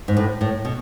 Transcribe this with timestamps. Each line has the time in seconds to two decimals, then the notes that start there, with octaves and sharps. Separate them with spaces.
0.08 G#2
0.17 A2
0.41 A2
0.65 B2